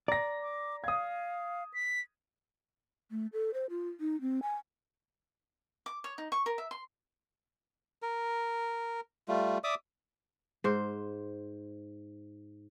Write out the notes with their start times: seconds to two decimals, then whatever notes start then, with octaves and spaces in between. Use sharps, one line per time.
0.08 D5 A#5 A#6
0.42 D6
0.84 F5 D#6 G#6
1.74 B6
3.11 A3
3.33 A4
3.54 C5
3.70 F4
4.00 D#4
4.21 C4
4.42 G#5
5.86 D6
6.04 C#5
6.18 D#4
6.32 C#6
6.46 A#4
6.58 E5
6.71 C6
8.02 A#4
9.28 G3 A3 F4
9.64 D5 E5 D6 D#6
10.64 G#2 C5